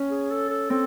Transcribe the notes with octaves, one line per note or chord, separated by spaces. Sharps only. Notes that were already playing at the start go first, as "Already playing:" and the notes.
Already playing: C#4
G#4
A4
A4
C4 A4